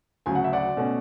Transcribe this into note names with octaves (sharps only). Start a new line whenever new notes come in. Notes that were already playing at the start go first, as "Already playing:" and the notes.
D2 C#3 F#3 G#5
F#5
E5
D5 F#5
B2 A3 C#4